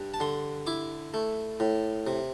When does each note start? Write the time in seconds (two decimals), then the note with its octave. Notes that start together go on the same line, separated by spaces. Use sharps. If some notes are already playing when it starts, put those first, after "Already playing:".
Already playing: G2
0.14 A5
0.20 D3 C6
0.67 E4 D6
1.14 A3
1.60 A2
2.07 C3